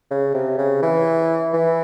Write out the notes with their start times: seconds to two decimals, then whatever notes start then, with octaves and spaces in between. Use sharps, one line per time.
0.10 C#3
0.34 C3
0.58 C#3
0.82 E3
1.53 E3